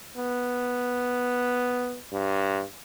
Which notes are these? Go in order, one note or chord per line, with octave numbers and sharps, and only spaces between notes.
B3
G2